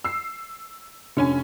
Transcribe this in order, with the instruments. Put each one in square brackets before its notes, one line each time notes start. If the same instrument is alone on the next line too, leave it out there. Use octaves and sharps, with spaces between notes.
[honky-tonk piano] E6 C7
[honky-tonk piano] F1 C#4 G#5 [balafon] D4